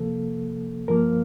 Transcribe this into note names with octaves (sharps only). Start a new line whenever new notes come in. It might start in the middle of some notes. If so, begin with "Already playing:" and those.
Already playing: C3 F3 A#3 A4
G2 F3 A#3 A#4